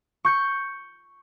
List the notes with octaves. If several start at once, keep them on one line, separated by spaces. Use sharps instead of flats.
C#6 G6 C#7